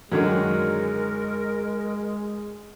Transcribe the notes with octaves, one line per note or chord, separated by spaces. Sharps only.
F#2 D3 D#3 F#3 G#3 A#4